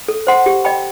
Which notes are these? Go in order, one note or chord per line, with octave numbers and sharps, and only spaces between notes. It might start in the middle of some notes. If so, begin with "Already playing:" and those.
A4
C5 F#5 C6
G4
D#5 G5 B5